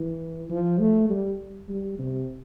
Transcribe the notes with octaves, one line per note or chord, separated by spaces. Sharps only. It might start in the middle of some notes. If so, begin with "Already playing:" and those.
Already playing: E3
F3
A3
G3
G3
C3